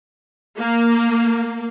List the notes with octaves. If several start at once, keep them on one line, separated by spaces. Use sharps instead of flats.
A#3